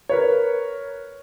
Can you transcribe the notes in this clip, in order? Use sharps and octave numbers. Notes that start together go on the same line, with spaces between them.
A#4 B4 C#5